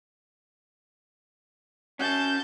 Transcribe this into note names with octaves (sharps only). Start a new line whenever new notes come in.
C#4 F#4 A5 G6